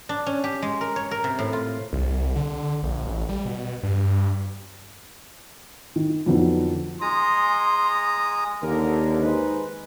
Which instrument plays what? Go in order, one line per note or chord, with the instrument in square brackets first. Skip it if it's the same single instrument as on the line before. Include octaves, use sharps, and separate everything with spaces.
[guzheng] D4
C#4
G4
G#3
A#4
C#5
A#4
C3
A2
F4
[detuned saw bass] C2
D3
A#1
A1
G3
B2
G2
[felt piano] D#3
F2 D3 F#3 B3 D#4
[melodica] G#3 A#5 D#6 [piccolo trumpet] C6
[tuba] D#2 [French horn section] D3 [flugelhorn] A#4
[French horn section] G#3 D#4 C5 [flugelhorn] B4